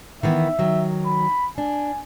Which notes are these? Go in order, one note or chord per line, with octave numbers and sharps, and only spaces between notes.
D#3 E3 B3 E5
D#3 F#3
B5
D4 G#5